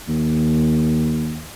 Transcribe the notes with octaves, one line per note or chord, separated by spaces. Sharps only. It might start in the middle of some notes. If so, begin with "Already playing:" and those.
D#2